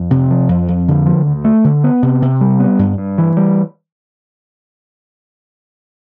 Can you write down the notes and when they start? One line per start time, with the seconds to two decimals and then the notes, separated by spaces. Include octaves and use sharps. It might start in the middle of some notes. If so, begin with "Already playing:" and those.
Already playing: F2
0.11 C3
0.31 F3
0.49 F2
0.68 F2
0.88 D3
1.06 F3
1.27 D2
1.44 A3
1.64 D3
1.84 B3
2.03 C3
2.22 C3
2.41 G3
2.59 B3
2.79 G2
2.98 G2
3.18 E3
3.37 G3